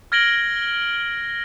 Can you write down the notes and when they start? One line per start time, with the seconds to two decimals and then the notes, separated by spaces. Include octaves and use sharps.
0.12 F6 G#6 A#6 D7 F#7 G7